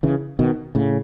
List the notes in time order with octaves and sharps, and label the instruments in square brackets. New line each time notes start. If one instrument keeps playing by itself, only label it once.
[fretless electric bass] C#3 E3
B2 D#3
A2 C#3